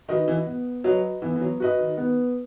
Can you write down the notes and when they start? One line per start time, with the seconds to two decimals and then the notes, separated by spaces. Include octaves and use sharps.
0.09 D#3 F#4 B4 D#5
0.28 E3
0.46 B3
0.84 F#3 F#4 B4 D#5
1.22 E3 B3
1.36 E3
1.41 F#3
1.60 F#4 B4 D#5
1.79 D#3
1.97 B3